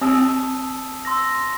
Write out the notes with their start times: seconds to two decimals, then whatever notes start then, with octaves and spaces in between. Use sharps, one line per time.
0.01 C4 A5 D#6 E6
1.05 C6 E6 A#6